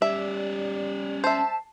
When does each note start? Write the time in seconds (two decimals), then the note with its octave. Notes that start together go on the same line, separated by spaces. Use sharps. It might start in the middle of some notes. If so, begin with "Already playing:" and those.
0.02 G3 C#4 D5 E5
1.24 C5 E5 A5